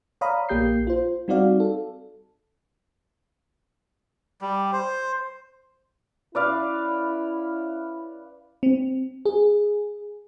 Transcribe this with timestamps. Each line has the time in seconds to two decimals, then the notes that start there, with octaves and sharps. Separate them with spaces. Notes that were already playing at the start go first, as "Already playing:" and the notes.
0.21 C#5 D5 F5 A#5 B5 D#6
0.49 A#1 A#3 G4 G6 C7
0.87 F4 C5
1.28 G3 C4 D#4 F#4 D5 F5
1.60 A4
4.41 G3
4.73 C5
6.35 C#4 E4 B4 D5 F5
8.63 C4
9.25 G#4